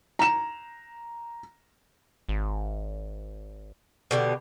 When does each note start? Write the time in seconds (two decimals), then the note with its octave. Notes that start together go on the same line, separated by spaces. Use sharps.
0.19 A#5 E7
2.29 G#1
4.11 B2 D3 G4